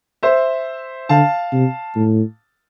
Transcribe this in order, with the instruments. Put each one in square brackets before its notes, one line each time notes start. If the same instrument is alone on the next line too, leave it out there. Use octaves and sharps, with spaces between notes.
[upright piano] C5 E5
[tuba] D3 [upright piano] F5 A5
[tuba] C3
A2